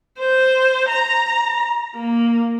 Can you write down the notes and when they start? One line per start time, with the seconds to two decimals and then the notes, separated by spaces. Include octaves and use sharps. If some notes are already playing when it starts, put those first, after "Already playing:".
0.19 C5
0.89 A#5
1.95 A#3